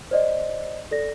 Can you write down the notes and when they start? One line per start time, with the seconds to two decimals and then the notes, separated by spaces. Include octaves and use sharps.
0.11 C5 D5 D#5
0.91 A4 D5 A#6